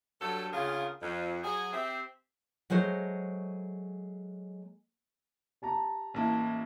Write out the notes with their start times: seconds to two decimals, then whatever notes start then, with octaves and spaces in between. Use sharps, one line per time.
0.21 G2 F#3 A4
0.53 D2 C#3 F4 G#4 A#4
1.02 F2
1.44 F#3 G#4
1.73 C4 G4 E5
2.70 F#3 G#3 A3 C5 C#5
5.62 G4 A5 A#5
6.14 A1 A#3 E4 A5